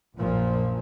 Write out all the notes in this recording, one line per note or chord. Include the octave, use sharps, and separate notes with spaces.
A#1 F#2 A#2 F3